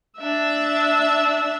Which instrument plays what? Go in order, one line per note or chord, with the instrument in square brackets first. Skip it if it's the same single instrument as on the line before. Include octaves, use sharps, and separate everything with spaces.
[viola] D4 E5